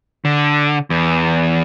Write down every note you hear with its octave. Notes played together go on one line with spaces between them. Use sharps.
D3
E2